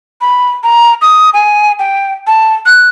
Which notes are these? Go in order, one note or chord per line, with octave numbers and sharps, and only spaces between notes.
B5
A#5
D#6
G#5
G5
A5
F#6